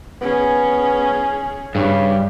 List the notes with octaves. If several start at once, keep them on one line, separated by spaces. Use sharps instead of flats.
B3 C#4 G#4
G2 C#3 D4 G4